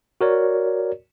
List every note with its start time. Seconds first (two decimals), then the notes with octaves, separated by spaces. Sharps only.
0.21 F#4 A#4 C#5 D5